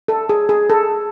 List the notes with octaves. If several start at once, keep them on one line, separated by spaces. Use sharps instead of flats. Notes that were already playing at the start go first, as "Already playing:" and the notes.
A4
G#4
G#4
A4